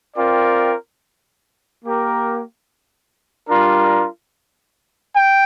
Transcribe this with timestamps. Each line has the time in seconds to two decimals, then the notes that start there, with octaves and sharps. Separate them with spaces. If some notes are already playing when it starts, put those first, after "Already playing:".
0.17 C4 F4 A#4 D5 G5
1.83 A#3 G4 A#4
3.49 G3 D4 F4 A#4
5.14 G5